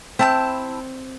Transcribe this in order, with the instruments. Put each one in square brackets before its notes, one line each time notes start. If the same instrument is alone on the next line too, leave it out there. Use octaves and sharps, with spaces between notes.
[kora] C4 [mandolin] E4 A5 G6